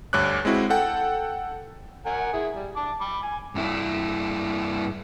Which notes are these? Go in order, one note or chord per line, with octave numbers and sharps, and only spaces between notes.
D2 G2 C#5 D6 F#6
G#3 C4 E4 F#4
A4 F#5 G5
A#4 F#5 G#5
E4 G#4
G3
A5 D6
B5 D6
G#5
G2 E4